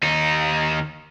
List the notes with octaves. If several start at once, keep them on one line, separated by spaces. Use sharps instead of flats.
D#2 D#4